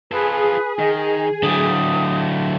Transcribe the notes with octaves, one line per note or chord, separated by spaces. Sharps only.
F4 G#4 A4 B4
D#3 D#5
D3 F#3 A3 G4 D#6